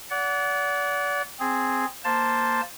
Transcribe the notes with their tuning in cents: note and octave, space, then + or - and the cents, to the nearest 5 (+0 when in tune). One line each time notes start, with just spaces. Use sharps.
D5 -35 F#5 +0
C4 +0 G#4 +0
A#3 +0 C5 +0 A5 +0